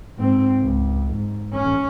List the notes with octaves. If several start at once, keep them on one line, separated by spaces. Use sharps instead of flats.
G#2 C4
C#2
G#2
C#4